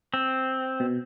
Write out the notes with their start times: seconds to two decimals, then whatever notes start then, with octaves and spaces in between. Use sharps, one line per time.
0.14 C4
0.80 B2